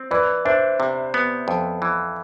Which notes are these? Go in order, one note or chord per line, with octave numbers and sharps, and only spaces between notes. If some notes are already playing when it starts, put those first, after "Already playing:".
Already playing: C4
E3 B4 D5
D4 C5 E5
C3
B3
F2
E3